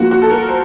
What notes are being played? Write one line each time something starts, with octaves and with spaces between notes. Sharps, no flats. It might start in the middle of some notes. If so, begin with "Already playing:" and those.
Already playing: F3 A#3 F4 F#4
F#4
A4
A#4
C5